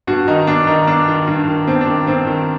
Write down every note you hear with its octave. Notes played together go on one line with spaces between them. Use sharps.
G2 F#4
D#3 D#4
G2 D4
D#3 D#4
G2 D4
D#3
G2
D#3
G2 C4
D4
D#3
G2 C4
D#3